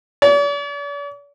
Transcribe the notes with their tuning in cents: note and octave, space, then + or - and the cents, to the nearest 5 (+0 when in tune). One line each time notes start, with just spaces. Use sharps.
D5 -45